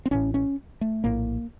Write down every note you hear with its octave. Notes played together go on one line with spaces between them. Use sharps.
C4
A1 A2 C#4
C#4
A3
A#1 A2 A#3